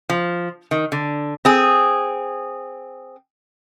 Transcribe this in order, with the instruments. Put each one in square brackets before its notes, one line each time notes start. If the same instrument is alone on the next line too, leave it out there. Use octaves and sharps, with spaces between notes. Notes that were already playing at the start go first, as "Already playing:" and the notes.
[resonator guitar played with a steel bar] F3
D#3
D3
C4 G#4